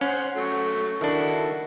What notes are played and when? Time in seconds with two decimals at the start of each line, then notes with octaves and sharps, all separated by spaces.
0.01 C#4 C5 F#5
0.36 F#3 A3 C#6
1.01 D#3 D4 E4 F#4 A4